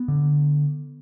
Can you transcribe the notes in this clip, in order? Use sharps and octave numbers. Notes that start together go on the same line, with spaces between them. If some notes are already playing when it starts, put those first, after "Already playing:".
Already playing: B3
D3